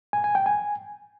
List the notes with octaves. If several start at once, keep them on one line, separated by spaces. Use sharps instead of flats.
G#5
G#5
G5
G#5